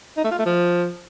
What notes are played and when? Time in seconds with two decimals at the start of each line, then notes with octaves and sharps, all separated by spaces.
0.17 D#4
0.24 A3
0.31 F4
0.39 A3
0.46 F3